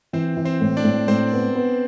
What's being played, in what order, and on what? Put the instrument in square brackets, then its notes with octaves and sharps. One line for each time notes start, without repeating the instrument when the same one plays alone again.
[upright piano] E3 [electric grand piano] C4 C5
[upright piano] E3
[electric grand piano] C4 C5
[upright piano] A2
[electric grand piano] D4 D5
[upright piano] A2
[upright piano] A2 [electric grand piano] C4 C5
[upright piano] B3
B3